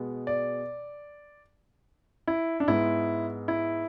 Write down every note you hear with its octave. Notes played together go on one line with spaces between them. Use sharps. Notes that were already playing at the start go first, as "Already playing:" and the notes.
Already playing: B2 G#3 B3
D5
E4
D4
G#2 G#3 B3 E4
E4